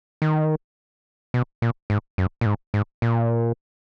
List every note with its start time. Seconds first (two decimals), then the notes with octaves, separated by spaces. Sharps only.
0.22 D#3
1.34 B2
1.62 A#2
1.90 G#2
2.18 F#2
2.41 A#2
2.46 G#2
2.74 G#2
3.02 A#2